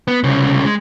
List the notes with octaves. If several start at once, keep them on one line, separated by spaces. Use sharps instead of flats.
B3
C2 C#3
G#3